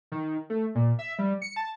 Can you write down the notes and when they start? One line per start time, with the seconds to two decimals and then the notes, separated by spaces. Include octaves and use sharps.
0.12 D#3
0.50 A3
0.75 A#2
0.99 E5
1.19 G3
1.42 C#7
1.56 A5